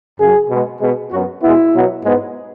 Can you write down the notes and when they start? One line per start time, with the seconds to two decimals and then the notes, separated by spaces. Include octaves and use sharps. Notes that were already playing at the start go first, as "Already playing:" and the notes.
0.19 F#2 C#3 F#3 G#4
0.50 B2 G#3 B3
0.81 B2 G#3 B3 G#4
1.12 F#2 F#3 B3 F#4
1.42 B2 G#3 B3 E4
1.74 B2 F#3 B3
2.04 G#2 G#3 B3